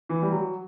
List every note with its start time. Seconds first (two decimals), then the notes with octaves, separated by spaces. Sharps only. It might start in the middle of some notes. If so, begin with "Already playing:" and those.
0.09 E3
0.22 G3
0.32 F#3